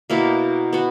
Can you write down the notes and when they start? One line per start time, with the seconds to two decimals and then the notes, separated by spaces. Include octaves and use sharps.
0.10 B2 A#3 E4
0.73 B3 F#4